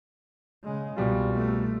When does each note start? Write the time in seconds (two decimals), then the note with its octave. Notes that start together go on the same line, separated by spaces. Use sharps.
0.63 C#3 G#3
0.96 C2 B2 G3 F4
1.35 A3